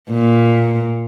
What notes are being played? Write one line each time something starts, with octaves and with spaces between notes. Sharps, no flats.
A#2